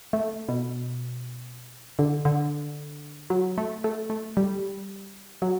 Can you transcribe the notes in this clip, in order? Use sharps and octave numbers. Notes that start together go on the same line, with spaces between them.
A3
B2
D3
D3
F#3
A3
A3
A3
G3
F#3